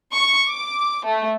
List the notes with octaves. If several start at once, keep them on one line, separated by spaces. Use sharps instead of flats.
C#6
D6
A3